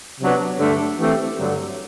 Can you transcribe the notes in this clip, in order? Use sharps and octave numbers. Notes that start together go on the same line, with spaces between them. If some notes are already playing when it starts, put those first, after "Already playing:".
C3 F#3 B3 D4
G2 D3 A3 D4
E3 A3 C4 G4
G2 D3 F#3